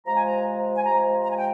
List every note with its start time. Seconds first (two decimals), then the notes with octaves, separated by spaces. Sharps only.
0.05 C3 F3 G#3 A#5
0.16 G#5
0.27 A#5
0.77 G#5
0.84 C3 F3 G#3 A#5
1.23 A#5
1.31 G#5
1.38 G5